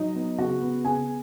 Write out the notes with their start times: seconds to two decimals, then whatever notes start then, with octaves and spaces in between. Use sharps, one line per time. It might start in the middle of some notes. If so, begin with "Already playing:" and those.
Already playing: F#3 D#4 D#5
0.15 B3
0.38 C#3 F#4 F#5
0.62 B3
0.85 C#3 G#4 G#5